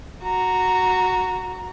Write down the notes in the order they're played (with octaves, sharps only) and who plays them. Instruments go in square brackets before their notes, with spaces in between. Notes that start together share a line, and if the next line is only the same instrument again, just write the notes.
[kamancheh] F#4 A#5